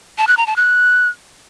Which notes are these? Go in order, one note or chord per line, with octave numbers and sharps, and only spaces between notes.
A5
F#6
A#5
A5
F#6